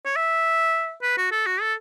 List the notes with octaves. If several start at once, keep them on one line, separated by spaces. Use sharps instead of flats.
C#5
E5
B4
F#4
A4
F#4
A4